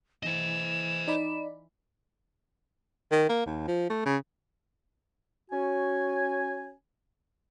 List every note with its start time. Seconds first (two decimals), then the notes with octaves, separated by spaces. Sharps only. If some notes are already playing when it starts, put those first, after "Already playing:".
0.23 E3 C5 D#5 E7
1.08 D#4 D5 B5
3.12 D#3
3.29 A#3
3.46 D#2
3.68 F3
3.90 A3
4.06 C#3
5.51 C#4 F#4 G#5